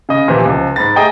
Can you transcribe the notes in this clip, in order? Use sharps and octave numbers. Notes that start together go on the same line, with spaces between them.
C#3 D#5
A#2 E3 F3 G4
C#2 F3
G#2 B5 A6
A3 G#4 D#5 G5 A#5